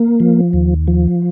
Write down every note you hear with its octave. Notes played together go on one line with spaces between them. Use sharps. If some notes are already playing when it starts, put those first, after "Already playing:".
Already playing: A#3
F3
D#2
F3